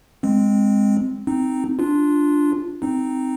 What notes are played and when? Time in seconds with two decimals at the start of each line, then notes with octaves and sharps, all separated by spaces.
0.23 G#3 C4
1.27 C4 D#4
1.79 D4 F4
2.82 C4 D#4